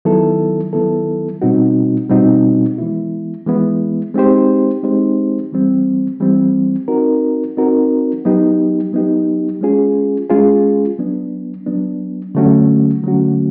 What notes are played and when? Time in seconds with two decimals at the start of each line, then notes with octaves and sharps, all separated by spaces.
0.05 D#3 F#3 B3 E4 A4
0.73 D#3 F#3 B3 E4 A4
1.42 B2 G3 C4 D#4 F#4
2.10 B2 G3 C4 D#4 F#4
2.78 E3 G#3 B3 E4
3.46 E3 G#3 B3 E4
4.15 G#3 C4 D#4 G4 C5
4.83 G#3 C4 D#4 G4 C5
5.52 E3 G3 C4
6.20 E3 G3 C4
6.88 C4 D#4 F#4 A#4
7.57 C4 D#4 F#4 A#4
8.25 F#3 B3 D#4 G4
8.93 F#3 B3 D#4 G4
9.61 G#3 C#4 F4 G#4
10.30 G#3 C#4 F4 G#4
10.98 F#3 B3 D4
11.66 F#3 B3 D4
12.35 D3 F#3 A3 C#4 F#4
13.03 D3 F#3 A3 C#4 F#4